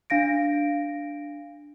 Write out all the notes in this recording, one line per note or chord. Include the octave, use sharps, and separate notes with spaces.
D4 F5 A#6 D7